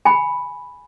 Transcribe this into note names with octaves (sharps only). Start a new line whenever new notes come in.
G#5 B5